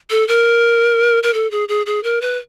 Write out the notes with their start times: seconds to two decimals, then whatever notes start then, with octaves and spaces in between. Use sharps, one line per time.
0.10 A4
0.28 A#4
1.23 A#4
1.34 A4
1.51 G#4
1.69 G#4
1.86 G#4
2.04 A#4
2.21 B4